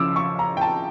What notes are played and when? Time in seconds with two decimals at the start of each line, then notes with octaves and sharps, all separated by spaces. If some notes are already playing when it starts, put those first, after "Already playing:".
Already playing: C#3 F3 C#4 E4 D6 E6
0.16 C#6
0.39 A#5
0.57 G5
0.61 A5